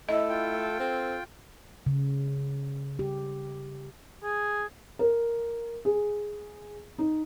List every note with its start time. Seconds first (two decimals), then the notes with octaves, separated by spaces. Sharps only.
0.09 A3 E4 D#5
0.29 F4 G5
0.80 C4 A4
1.86 C#3
2.99 G4
4.24 G#4
4.99 A#4
5.85 G#4
6.98 D#4